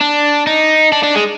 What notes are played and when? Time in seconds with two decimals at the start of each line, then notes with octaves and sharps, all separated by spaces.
0.01 D4
0.47 D#4
0.92 D4
1.04 D4
1.16 G#3